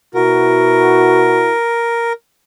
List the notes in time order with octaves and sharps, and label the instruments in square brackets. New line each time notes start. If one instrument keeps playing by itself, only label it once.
[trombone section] B2 E4 F#4 [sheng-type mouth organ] A#4